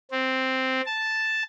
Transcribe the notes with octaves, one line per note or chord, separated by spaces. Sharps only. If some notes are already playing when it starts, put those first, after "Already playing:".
C4
A5